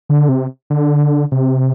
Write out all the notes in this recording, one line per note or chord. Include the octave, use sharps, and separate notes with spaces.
D3
C3
D3
C3